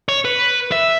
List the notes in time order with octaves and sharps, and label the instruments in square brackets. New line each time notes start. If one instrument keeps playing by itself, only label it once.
[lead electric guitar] C#5
B4
E5